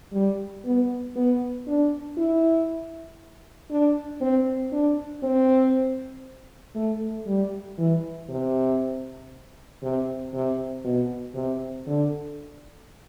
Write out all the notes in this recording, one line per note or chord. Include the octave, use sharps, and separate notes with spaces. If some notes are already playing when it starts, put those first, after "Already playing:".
G3
B3
B3
D4
E4
D4
C4
D4
C4
A3
G3
E3
C3
C3
C3
B2
C3
D3